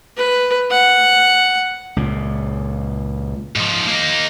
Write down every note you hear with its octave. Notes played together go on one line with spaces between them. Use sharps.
B4
F#5
C#2 A#2
G#2 F3
A#3 D#4